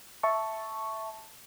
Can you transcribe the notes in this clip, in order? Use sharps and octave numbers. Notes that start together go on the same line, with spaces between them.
E5 A5 C#6